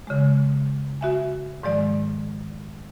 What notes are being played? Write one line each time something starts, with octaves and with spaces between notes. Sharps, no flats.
C#3 G#3
F#4 E5 G#5
G#2 D#3 F3 G#3 D5